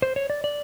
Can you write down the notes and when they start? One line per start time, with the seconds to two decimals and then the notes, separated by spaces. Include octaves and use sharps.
0.02 C5
0.16 C#5
0.30 D5
0.44 D5